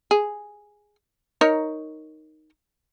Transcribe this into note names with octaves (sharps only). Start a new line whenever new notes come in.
G#4
D#4 A#4 C#5